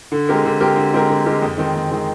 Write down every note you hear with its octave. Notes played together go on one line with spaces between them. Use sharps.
D3
G#3 C4 G4 A#4
D3
G#3 C4 G4 A#4
D3
G#3 C4 G4 A#4
D3
G#3 C4 G4 A#4
F2
D#3 G#3 C4
F2
D#3 G#3 C4